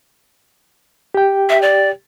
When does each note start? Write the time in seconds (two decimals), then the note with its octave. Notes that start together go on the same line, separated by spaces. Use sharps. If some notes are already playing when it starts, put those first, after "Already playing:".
1.14 G4 G5
1.49 E5
1.62 D5